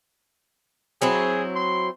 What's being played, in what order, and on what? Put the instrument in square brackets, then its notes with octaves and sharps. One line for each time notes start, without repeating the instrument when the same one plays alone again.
[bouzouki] F#3 C4 E4 [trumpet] G#4
[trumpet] C6